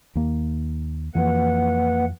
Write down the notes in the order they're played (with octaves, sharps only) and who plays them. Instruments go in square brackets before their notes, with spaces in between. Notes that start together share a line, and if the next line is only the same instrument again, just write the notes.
[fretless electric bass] D#2 A#3
[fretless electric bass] F2 E3 [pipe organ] A#3 B4 F#5